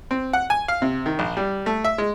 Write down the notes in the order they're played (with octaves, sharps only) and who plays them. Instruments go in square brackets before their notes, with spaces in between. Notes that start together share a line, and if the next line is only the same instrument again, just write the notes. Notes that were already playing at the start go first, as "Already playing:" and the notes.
[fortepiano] C4
F#5
G#5
F5
C3
D#3
A#1
G3
A3
E5
G#3